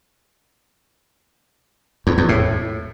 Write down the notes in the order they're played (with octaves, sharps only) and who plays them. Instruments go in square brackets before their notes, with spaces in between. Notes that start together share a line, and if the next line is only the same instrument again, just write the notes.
[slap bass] E2
E2
A2